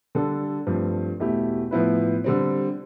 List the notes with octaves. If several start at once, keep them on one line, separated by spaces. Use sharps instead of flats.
D3 G3 D4 A4
G2 F3 A3 C4
E2 B2 A3 E4 G4
A2 F3 B3 E4 B4
D3 G3 C4